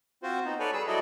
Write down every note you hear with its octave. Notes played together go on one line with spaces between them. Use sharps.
C4 F4 F#4 C5
B3 D#4
A4 B4 C#5 D5 G#5
G3 G#4 E6
F#3 E4 F#4 A4 D5 D#5